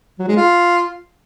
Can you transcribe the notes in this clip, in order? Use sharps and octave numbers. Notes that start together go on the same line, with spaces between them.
F#3
G#3
F4